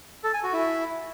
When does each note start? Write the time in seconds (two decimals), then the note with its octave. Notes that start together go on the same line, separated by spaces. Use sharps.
0.24 A4
0.34 G#5
0.43 F#4
0.53 E4